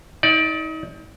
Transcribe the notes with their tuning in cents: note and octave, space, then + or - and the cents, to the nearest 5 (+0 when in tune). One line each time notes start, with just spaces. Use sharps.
D#4 +35 D5 +0